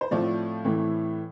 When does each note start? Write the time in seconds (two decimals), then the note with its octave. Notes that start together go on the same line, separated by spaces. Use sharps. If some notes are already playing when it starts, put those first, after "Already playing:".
0.01 C5
0.11 A2 F3 A3 C4 D5
0.65 A2 E3 A3 C4